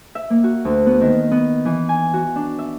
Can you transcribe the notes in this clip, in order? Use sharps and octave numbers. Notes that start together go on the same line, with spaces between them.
E5
A#3
F#4
D2
B3
D#3
B3
E3
G#5
F#4
D4
E5